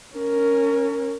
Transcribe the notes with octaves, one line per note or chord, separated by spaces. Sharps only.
C#4 A#4